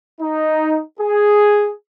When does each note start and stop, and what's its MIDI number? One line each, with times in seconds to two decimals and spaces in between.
0.21 0.82 63
1.00 1.71 68